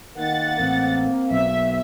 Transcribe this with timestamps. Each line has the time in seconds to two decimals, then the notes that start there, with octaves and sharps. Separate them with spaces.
0.17 D#3 A#3 F#5 A6
0.60 A1 C4
1.31 B1 E5